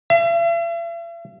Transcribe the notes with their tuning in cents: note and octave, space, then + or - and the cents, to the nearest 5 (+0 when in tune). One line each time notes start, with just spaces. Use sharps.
E5 +45